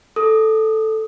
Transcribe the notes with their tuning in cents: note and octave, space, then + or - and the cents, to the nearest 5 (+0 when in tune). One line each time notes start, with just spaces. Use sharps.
A4 +0 D#6 +20